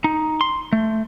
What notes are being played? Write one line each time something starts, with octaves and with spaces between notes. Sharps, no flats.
D#4
C6
A3